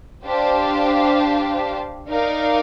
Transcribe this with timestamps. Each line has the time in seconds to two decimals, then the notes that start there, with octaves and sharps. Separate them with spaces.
0.24 D4 G4 C5 F5 A5
2.09 D#4 A#4 D5 F5